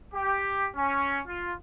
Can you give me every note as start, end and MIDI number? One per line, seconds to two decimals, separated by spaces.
0.14 0.69 67
0.76 1.20 61
1.27 1.54 65